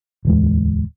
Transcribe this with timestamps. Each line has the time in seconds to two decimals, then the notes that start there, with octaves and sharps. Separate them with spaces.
0.25 D1 E2 G#3